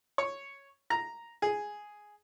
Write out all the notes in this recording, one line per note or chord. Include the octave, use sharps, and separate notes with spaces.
C#5
A#5
G#4